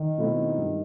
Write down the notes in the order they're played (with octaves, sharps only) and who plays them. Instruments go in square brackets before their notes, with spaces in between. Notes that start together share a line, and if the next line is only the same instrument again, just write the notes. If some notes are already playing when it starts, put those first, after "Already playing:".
Already playing: [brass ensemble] D#3
[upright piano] B2 A3 C4 E4
G2